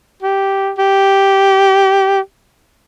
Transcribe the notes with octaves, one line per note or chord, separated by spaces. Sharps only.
G4
G4